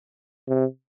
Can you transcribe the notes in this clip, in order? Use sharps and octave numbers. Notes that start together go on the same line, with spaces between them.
C3